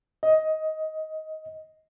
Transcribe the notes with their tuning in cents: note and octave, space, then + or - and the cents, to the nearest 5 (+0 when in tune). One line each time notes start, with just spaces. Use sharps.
D#5 +15